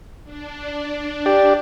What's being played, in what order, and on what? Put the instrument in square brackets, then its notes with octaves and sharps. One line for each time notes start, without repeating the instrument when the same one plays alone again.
[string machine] D4
[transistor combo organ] G4 D5